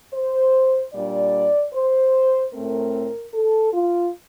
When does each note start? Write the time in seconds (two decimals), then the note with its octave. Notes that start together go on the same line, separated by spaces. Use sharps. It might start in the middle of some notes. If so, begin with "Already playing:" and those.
0.13 C5
0.93 A#2 G3 D4 D5
1.73 C5
2.53 A2 A3 C4 A#4
3.34 A4
3.73 F4